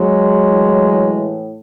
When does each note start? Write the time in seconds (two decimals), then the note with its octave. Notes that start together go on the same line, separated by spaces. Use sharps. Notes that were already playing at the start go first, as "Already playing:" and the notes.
Already playing: F#3 G#3
0.48 A2 E3